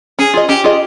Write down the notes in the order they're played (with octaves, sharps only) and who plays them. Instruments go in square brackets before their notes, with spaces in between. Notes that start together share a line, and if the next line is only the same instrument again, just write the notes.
[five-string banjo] C#4 [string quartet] G#4
[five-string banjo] F4 G#4 D#5
[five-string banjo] C#4 [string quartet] G4
[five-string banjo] F4 G#4 D#5